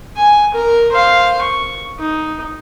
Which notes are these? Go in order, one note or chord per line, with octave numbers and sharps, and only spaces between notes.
G#5
A#4
C5 F5
C#6
D#4